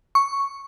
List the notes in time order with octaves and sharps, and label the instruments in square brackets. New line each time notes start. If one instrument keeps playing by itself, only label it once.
[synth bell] C#6